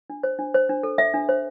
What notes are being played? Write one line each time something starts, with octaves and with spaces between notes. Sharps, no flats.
D4
C5
D4
C5
D4
A4
A4 E5
D4
C5